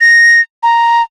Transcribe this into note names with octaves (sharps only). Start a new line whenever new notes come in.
A#6
A#5